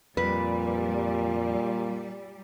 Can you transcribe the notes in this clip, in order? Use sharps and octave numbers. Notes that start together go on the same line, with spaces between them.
F2 A#2 G3 B4